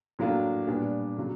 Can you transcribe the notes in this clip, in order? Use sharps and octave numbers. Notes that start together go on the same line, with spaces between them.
A2 F#3 A#3 D4 F4
A#2 G3 B3 D4
C#3 F#3